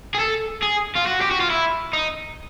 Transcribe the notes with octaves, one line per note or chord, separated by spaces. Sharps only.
G#4
A4
G#4
F4
F#4
G4
F#4
F4
E4
D#4